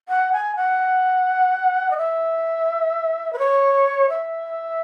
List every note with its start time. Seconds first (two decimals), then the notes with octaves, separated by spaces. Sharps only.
0.09 F#5
0.33 G#5
0.56 F#5
1.91 D#5
1.97 E5
3.33 B4
3.39 C#5
4.10 E5